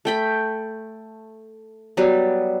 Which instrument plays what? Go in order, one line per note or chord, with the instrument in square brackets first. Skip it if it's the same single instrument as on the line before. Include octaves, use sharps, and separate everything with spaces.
[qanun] A3 G5 B5
F#3 G3 B3 B4